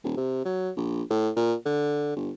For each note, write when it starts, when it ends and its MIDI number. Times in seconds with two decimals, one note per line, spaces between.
0.04 0.14 27
0.17 0.45 48
0.45 0.70 54
0.76 1.03 34
1.10 1.30 45
1.36 1.54 46
1.65 2.12 50
2.16 2.31 31